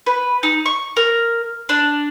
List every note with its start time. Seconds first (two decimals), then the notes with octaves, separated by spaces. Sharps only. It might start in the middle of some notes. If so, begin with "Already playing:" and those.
0.06 B4
0.43 D#4
0.66 C#6
0.97 A#4
1.69 D4